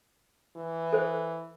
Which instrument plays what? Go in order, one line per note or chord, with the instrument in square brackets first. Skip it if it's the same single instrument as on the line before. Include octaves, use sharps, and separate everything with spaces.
[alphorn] E3
[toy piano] A4 C5